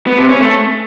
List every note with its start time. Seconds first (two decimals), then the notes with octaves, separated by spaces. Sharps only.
0.07 B3
0.18 C3
0.29 C#4
0.40 A3